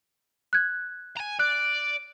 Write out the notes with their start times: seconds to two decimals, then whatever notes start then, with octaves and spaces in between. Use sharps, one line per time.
0.53 F#6 G#6
1.17 G#5 A#5
1.39 D5 F#6